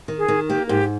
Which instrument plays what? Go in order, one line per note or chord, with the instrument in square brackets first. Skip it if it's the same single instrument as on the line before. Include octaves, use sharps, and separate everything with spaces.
[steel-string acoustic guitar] D#3
[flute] G#4
[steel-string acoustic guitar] D#3
[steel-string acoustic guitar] A#3 [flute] G4
[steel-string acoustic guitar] G#2 [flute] G4